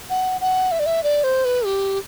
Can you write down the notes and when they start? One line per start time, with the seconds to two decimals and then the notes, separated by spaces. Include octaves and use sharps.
0.10 F#5
0.41 F#5
0.72 E5
0.80 D5
0.86 E5
1.03 D5
1.24 C5
1.45 B4
1.65 G4